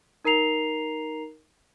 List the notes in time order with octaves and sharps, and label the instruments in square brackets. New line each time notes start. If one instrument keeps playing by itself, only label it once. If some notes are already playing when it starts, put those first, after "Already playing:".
[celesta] D#4 A#4 A#5 C7 F7